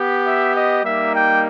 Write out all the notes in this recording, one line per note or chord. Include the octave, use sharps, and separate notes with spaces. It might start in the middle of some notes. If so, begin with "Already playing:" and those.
Already playing: B3 G4
E5
D#5
G3 A#3 D#4 E5
G5